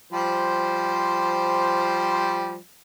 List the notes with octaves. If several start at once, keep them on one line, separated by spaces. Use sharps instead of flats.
F3 G3 C5